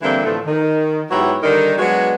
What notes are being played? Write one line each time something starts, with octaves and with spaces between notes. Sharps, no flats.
D3 E3 G3 A#3 C4 E4
A2 D3 E3 F3 A3
D#3
G#2 F#3 B3 E4 G4 C#5
D3 D#3 G3 D#4 A#4
F#3 G#3 B3 D4 F#4